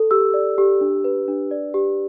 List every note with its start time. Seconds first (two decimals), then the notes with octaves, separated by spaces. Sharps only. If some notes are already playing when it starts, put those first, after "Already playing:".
Already playing: A4
0.11 G4 E6
0.34 D5
0.58 G4
0.81 D4
1.04 B4
1.28 D4
1.51 D5
1.74 G4